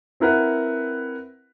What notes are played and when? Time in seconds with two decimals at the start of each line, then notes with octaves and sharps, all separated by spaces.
0.20 C4 E4 A#4 B4 F#5